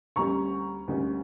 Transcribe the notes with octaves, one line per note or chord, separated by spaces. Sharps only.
D2 D3 G3 A#3 C#4 A#5 C#6
D2 D3 G3 A#3 C#4